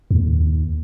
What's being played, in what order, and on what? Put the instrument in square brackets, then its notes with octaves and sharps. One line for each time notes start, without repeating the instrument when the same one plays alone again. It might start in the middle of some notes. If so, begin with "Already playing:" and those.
[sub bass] D#2